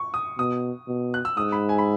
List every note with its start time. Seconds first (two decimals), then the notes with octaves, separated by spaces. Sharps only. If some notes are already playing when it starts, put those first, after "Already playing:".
Already playing: C#6
0.14 D#6
0.38 B2 D#6
0.88 B2
1.14 F#6
1.25 E6
1.37 G#2 D#6
1.52 B5
1.69 G#5
1.78 B5